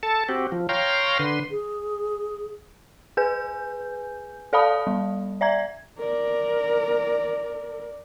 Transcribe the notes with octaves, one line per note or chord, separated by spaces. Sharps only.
A4 A5
C4 F#4 G4
F3
C#5 F5 G5 A#5 C6
D3 B4 C6
G#4
G#4 B4 G#5 G6
A4 D5 F5 A5 B5 D#6
G3
D5 E5 A#5 G#6
A#4 D5